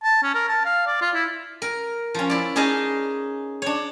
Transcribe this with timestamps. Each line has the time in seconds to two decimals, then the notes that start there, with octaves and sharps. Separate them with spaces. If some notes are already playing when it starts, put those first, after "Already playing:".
0.04 A5
0.23 C#4
0.35 A#4
0.48 A5
0.65 F5
0.87 D5
1.01 F4
1.15 E4
1.62 A#4
2.14 F3 C#4
2.30 E4 D5
2.56 C#4 D#4 G#4 D#5 A5
3.62 D4 C#5